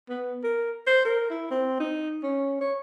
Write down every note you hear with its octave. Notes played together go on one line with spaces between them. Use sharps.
B3
A#4
C5
A#4
E4
C4
D#4
C#4
C#5